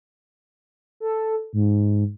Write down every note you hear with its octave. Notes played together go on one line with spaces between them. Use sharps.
A4
G#2